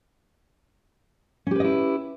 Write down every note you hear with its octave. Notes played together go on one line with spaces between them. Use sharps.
C#4 E4 G4 B4 D#5